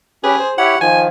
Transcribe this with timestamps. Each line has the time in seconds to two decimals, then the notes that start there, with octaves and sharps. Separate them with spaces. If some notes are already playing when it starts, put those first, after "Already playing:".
0.24 C#4 G4 G#4 B4
0.39 C5
0.58 E4 G4 C#5 F#5
0.81 D#3 F3 G#5